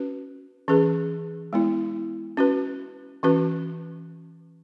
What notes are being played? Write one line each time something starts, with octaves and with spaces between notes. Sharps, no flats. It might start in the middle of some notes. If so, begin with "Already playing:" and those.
Already playing: C#4 F#4 B4
E3 C#4 G#4 B4
G#3 B3 E4
C#4 F#4 B4
E3 C#4 F#4 B4